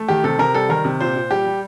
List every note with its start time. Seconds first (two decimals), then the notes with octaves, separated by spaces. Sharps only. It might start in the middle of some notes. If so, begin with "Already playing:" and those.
Already playing: A3
0.08 D#3 G4
0.24 C3 A4
0.39 C3 A#4
0.54 G3 A4
0.69 D#3 A#4
0.85 C3
1.00 A#2 C5
1.15 A#2
1.31 G3 G4
1.46 G3